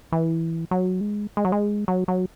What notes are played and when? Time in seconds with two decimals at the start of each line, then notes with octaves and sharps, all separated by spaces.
0.12 E3
0.71 F#3
1.01 G#3
1.37 G#3
1.45 F#3
1.52 G#3
1.88 F#3
2.08 F#3